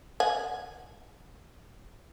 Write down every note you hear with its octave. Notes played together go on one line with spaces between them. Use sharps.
F#5 G#5